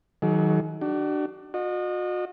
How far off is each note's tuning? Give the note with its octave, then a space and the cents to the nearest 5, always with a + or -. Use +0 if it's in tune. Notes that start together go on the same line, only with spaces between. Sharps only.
D#3 +30 F#3 +10 G#4 +40
D4 +20 F#4 +45
F#4 -40 D#5 -30